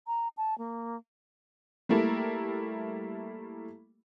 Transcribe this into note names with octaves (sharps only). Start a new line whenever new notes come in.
A#5
A5
A#3
G3 A3 A#3 E4 A4 A#4